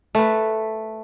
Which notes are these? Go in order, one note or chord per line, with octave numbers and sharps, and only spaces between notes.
A3 B4